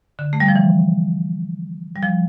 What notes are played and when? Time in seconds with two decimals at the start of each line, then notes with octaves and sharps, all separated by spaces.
0.19 D3
0.33 A3
0.40 G3
0.48 F3
0.55 E3
1.96 G3
2.03 F3